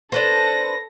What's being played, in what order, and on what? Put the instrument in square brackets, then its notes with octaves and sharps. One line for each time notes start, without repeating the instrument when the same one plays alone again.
[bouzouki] D4 B4 C5 [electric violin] A4 A#6